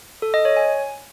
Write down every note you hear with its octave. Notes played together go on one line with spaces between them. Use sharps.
A4
D#5
C#5
G#5